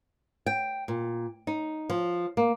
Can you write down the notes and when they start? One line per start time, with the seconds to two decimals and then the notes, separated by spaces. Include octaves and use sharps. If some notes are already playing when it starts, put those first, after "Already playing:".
0.46 G5
0.88 A#2
1.47 D#4
1.90 F3
2.37 A#3